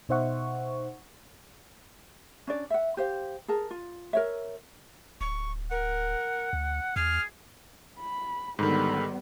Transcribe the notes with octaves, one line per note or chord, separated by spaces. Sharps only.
B2 D#4 C5 E5 F#5 C#6
C#4 D4 D5
E5 F#5
G4 C5 F5
G#4 A#4 A5
F4
A#4 C#5 E5
D1 C#6
A#4 F#5
D2
E2 G#4 F6
B5
G#2 D3 D#3 G3 B3 A4 B5